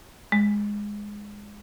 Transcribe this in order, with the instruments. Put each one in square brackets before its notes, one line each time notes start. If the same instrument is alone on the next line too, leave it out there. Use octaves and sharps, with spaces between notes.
[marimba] G#3